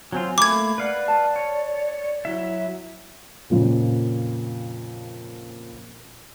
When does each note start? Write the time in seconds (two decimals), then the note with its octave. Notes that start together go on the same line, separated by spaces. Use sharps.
0.13 F#3 C4 F4 G#5
0.38 A3 A#3 B5 D6 G#6
0.78 B4 D5 F5 F#5
1.08 A5
1.36 C#5
2.25 F#3 E4 E5
3.50 F2 A#2 C#3